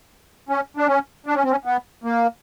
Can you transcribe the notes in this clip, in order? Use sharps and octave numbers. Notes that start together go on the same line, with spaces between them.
C#4
D4
C#4
D4
C#4
C4
C#4
B3
A#3